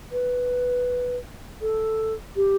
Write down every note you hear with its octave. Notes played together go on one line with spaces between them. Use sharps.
B4
A4
G4